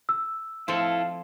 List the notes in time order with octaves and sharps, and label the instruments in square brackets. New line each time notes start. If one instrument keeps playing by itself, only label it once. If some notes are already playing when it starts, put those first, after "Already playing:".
[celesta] E6
[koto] F3 C4 [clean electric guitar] E4 A4 [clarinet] F5